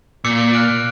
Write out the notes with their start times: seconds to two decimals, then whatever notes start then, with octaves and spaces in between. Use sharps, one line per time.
0.25 A#2 D6 E6 C#7
0.53 F6 F#6 D7